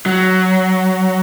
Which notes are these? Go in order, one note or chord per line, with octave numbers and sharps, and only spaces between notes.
F#3